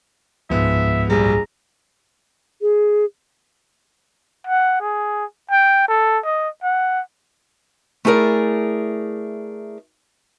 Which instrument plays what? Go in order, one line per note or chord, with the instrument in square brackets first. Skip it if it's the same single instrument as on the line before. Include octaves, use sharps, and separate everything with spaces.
[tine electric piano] C#2 G#2 [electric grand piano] F3 G#3 B3 [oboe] E5
[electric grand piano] A#1 G3 [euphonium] G#4 [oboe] A#5
[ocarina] G#4
[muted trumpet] F#5
G#4
G5
A4
D#5
F#5
[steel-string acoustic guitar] A3 E4 G#4 A#4 D5